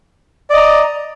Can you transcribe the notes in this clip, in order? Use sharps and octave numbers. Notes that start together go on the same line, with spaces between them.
D5 D#5 A#5